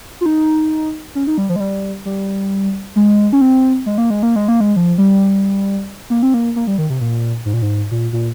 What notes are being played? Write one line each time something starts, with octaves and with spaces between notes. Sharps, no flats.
F4
D#4
C#4
D#4
G3
F3
G#3
G3
G3
G#3
C#4
C4
G#3
A#3
G#3
A#3
G#3
A#3
G#3
F3
G3
A#3
C4
A#3
A#3
G3
D#3
C3
A#2
G#2
A#2
G#2
A#2
A#2